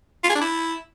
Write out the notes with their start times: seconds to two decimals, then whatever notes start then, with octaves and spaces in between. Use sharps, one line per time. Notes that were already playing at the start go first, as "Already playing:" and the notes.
0.24 F4
0.29 G#4
0.35 D4
0.41 E4